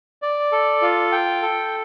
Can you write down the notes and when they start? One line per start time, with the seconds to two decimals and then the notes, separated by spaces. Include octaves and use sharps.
0.22 D5
0.52 A4
0.82 F4
1.12 G5
1.42 A4